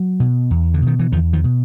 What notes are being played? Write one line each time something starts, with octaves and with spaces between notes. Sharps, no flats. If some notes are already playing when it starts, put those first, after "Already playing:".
Already playing: F#3
B2
E2
D3
B2 D#3
E3
E2 D#3 F3
D#3 F3
B2